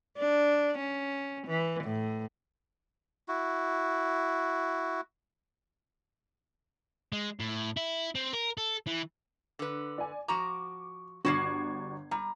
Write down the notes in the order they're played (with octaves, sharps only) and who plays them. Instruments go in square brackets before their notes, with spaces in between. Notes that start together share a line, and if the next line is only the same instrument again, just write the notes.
[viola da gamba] D4
C#4
E3
A2
[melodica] E4 F#4
[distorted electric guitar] G#3
A2
E4
C4
A#4
A4
E3
[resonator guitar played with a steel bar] D3 B4
[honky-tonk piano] D5 G#5
[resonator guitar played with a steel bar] F3 F#4 A#5 [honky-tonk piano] D6
[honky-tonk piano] G1 G#6 C7 [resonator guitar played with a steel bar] G3 D4 F#4
[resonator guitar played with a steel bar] G3 [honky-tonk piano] A#5